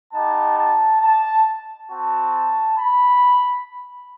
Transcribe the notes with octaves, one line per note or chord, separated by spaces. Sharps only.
B3 D#4 G4 A5
A5
A5
C4 F#4 A5
B5